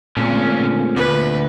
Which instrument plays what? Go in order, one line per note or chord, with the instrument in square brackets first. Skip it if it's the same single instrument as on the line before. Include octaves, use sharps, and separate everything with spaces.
[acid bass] A#2 [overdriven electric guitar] D3 C#4 [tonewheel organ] G#3 A3 C4
[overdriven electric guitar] D2 [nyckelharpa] B4